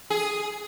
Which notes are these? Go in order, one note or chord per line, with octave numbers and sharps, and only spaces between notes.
G#4